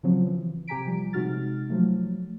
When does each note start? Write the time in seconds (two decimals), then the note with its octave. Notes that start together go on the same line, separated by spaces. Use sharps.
0.03 C#3 F3 F#3 C4
0.27 E3
0.68 C3 G4 G#5 A#5 B6 D7
0.87 F3 G3
1.13 C3 G#3 D#4 F#4 F6 A6
1.70 F3 F#3 A3